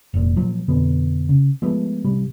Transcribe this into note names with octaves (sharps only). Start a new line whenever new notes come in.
F1 A#2
A#2 F3 F#3
F2 B2 D3 B3
C#3
F3 G#3 A3 B3
A1 C3 G3